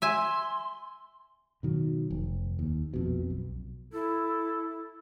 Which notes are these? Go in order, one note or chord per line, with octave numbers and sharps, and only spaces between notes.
E5 G#5 C6
B2 D#3 F#3
F1
D#2
A#1 F2 B2
B1
E4 A4